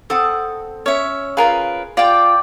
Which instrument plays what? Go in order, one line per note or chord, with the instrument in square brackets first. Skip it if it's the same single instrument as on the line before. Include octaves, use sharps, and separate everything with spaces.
[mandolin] C4 [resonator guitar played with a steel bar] A4 F#5 [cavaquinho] D#6
[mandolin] C#4 [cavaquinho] C#5 E5
[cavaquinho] F4 A#4 B4 [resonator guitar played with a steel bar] G#4 F5 G#5
[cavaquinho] F4 [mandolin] D5 G5